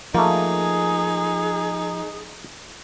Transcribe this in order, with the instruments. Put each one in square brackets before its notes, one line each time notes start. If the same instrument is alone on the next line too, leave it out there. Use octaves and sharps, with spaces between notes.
[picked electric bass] F3 [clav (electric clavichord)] A3 A#3 [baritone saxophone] D#4 [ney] G#4